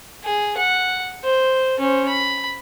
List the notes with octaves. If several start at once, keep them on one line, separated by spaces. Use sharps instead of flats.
G#4
F#5
C5
C#4 C5
B5